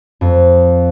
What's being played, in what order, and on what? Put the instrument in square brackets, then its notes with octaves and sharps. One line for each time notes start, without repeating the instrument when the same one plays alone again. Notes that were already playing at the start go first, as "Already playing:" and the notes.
[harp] F2